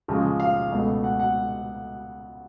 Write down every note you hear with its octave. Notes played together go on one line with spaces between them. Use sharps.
C#2 C#3 F3 G#3
F5
C#2 B2 A3
F#5
F#5